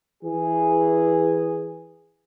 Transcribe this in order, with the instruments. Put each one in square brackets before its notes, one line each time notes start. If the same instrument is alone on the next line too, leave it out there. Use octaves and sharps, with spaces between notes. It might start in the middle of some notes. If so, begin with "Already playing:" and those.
[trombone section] E3 G#4